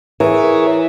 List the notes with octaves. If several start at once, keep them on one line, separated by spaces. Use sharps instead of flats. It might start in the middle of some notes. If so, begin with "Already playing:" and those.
E3 G#4 A#4 C#5